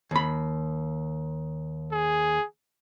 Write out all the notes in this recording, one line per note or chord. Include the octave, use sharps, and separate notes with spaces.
D#2 B5
G#4